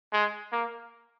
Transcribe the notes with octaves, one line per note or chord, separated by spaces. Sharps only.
G#3
A#3